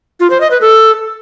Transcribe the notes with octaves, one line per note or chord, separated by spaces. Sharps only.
F4
C5
D#5
B4
A4